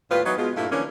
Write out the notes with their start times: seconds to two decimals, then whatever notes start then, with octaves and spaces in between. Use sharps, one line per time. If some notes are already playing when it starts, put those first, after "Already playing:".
0.10 D#2 A2 G3 F4 B4
0.25 E3 F#3 B3 D#4
0.37 B2 G#3 F4
0.56 G2 A#2 A3 E4 A#4 F5
0.71 D3 E3 F3 A#3 C#4